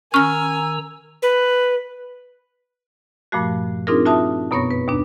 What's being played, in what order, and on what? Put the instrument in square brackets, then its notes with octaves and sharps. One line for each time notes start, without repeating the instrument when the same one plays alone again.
[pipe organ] D#3 A#5 E6 [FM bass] C#4 [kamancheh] G#5 [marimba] C#6 F6
[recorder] B4
[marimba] G2 A#2 F3 A3 F#4
C4 D4 D#4 F4 G#4 A#4
F4 F#4 E5 A5 D#6
F#2 B2 B3 C#5 C#6 A#6
B4
D#2 B2 D4